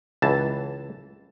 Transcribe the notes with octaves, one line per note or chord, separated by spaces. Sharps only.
C#2 E3 A5